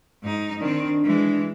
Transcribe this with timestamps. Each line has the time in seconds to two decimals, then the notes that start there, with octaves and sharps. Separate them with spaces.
0.23 G#2 D#4
0.60 D#3 C4 D4
1.05 E3 G#3